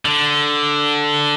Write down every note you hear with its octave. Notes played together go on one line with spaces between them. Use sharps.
D3